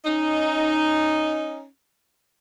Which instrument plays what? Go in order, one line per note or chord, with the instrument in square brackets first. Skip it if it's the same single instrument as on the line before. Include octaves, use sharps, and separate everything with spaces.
[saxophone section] C#4 D#4